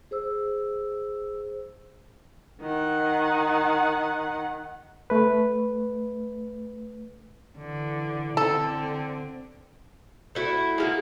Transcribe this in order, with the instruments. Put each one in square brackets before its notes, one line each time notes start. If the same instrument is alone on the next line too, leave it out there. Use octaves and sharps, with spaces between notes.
[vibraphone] G#4 C5 E6
[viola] D#3 F#5
[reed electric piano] A3 B4
[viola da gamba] D3 E3
[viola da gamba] D3 C4 [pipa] A4
[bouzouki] A3 E4 F#4
G#3 A#3 F#4